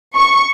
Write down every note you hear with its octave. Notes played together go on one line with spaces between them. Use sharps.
C#6